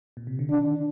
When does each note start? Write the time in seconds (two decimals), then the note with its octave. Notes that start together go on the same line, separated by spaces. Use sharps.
0.17 A#2
0.27 C3
0.39 D3
0.50 D#3 D4